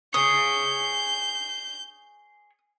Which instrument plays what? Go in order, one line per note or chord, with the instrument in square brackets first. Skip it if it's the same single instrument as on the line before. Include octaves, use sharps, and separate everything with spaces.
[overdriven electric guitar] G#4 C#5 [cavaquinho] D#6 [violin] G6